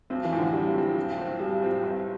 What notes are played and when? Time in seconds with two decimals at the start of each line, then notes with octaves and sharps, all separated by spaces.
0.10 B1 C4
0.25 E3
0.32 A2 F3 C4
0.39 D3
0.53 B1 G3
0.74 A2 F3 C4
0.96 B1
1.18 A2 F3 C4
1.39 B1 G3
1.62 A2 F3 C4
1.83 G1